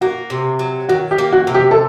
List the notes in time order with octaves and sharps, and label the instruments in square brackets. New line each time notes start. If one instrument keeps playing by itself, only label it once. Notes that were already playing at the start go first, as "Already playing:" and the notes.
[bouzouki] A#3 [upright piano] F#4
[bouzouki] C3
F#3
[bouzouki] D#3 [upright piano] F#4
[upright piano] G4
[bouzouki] A#3
[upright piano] F#4
[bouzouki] C3
[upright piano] G4
A4